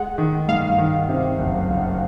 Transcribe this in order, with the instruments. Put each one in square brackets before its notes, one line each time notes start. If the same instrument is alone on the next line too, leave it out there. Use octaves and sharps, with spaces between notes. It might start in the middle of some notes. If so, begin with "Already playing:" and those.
Already playing: [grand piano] G#3 [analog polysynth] F#5
[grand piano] D#3
[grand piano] G2 [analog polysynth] F5
[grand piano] D#3
C3
F#1
F#1